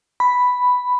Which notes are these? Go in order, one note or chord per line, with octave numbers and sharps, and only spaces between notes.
B5